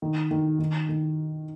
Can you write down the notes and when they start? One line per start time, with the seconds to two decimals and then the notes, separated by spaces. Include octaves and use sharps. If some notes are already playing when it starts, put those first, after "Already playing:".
0.02 D#3
0.31 D#3
0.59 D#3
0.89 D#3